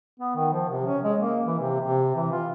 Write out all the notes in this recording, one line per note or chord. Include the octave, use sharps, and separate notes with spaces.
B3
D#3
F3
C3
C#4
G#3
A#3
E3
C3
C3
E3
F4